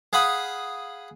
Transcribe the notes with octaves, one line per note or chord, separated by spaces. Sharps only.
G#4 F5 F#5 B5 D#6